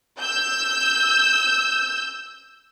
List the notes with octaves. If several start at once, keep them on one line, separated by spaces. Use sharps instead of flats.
E6 G6